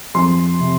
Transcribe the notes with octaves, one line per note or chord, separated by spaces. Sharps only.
F2 C6
C3